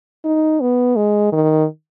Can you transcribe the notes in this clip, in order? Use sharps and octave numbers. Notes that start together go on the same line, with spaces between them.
D#4
B3
G#3
D#3